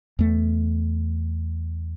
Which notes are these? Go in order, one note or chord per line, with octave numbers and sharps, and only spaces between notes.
E2 A3